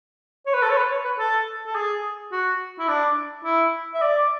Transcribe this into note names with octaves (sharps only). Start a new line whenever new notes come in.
C#5
B4
A4
C#5
B4
C#5
B4
A4
A4
G#4
F#4
E4
D4
E4
E5
D5